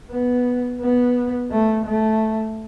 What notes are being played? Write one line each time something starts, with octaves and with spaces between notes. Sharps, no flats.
B3
B3
A3
A3